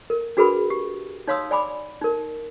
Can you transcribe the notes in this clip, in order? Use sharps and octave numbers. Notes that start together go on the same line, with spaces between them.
A#4
D4 F#4 G#4 A#4 B4 B5
G4
D#4 C#5 F5 C6 D#6 E6
D5 G#5 B5 D6
D#4 A#4